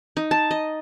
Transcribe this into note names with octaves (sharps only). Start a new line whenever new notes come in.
D#4
A5
D#5